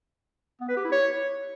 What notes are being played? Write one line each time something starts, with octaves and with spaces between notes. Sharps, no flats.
B3
B4
G4
E4
C#5